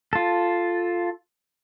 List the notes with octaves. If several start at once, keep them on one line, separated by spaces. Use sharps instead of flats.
F4 A4